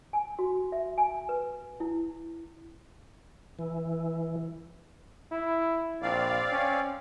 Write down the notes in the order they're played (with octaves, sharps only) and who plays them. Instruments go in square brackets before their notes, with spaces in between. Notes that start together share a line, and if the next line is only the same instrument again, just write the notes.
[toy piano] G#5
F#4
E5
G#5
B4
E4
[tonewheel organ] E3
[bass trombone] E4
[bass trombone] A#1 [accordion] C4 D5 F5
[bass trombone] C#4